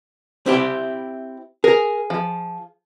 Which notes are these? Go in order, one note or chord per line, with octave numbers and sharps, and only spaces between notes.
C4 E4 G4
G#4 A#4
F3